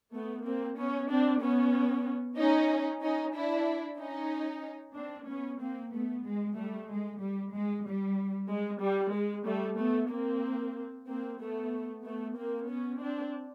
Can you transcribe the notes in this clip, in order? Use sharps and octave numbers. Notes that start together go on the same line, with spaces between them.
A3 B3
A#3 C4
B3 C#4
C4 D4
B3 C#4
C#4 D#4
C#4 D#4
D4 E4
C#4 D#4
C4 D4
B3 C#4
A#3 C4
A3 B3
G#3
G3 A3
G#3
G3
G#3
G3
G#3
G3
G#3
G3 A3
A3 B3
A#3 C4
A#3 C4
A3 B3
A3 B3
A#3 C4
B3 C#4
C4 D4